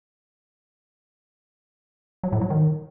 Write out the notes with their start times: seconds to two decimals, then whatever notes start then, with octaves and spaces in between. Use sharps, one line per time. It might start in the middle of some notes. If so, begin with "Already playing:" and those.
2.23 F#3
2.32 A2
2.41 F#3
2.50 D#3